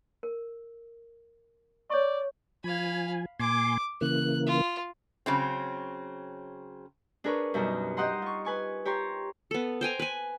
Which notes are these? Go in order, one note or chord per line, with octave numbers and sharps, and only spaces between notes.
A#4
C#5 D5 C#6
F3 F5 G#5 B5
A#2 G#5 C6 D6
C#3 E3 A#3 F#6
F4
C#3 F#3 C4
D4 G#4 A#4 B4 C#5
F#2 B2 G3 D4 D#4 A#5
D#4 G4 D#5 F#5 A#5 C6
F4 C#6
B4 G#5 C#6
G4 C#5 A#5 C6
B3 A4
C5 G5 G#5 A#5
B4 G#5